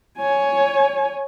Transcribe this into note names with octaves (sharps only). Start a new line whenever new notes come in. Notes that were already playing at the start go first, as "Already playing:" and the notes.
C#5 G#5